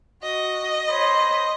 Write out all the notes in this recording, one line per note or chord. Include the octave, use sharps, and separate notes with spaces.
F#4 D#5
C5 C#5 B5